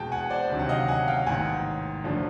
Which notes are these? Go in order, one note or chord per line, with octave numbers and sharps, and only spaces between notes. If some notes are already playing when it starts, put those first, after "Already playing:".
Already playing: E2 B2 G#3 G5 A5
F#5 G#5
C5 D5
D2 C3 D#3 F#3
F#5
D#5 F5
F#5 G#5
F5 G5
A1 G#2 D#3 F#5 G#5
G1 F#2 D3 F3 A3